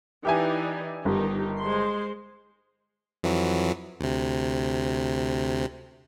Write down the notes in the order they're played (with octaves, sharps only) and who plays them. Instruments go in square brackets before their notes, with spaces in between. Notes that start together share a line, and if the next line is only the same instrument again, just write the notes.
[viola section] E3 D#4 D5 [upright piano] G4 E5 G#5
[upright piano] G1 [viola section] D#3 D#4 G4
[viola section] G#3 C5 C6
[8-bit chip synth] F2 E3 F#3
D2 C3